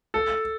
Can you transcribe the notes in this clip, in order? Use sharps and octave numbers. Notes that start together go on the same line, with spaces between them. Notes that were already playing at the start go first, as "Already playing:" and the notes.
A4